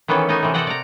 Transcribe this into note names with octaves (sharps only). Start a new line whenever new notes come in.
D#3 E3 B3 C#4 A4
A3 B3 D#4 A4 G#5
C3 E3
C3 A4 D5 D#5 F#5 G5
D5 A#5